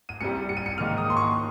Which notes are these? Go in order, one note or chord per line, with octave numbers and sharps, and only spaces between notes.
D#7
C2 C3 G3 C#7
C#7
D#7
C#7
G#2 D#3 A#3 F6
D#6
C6
C#6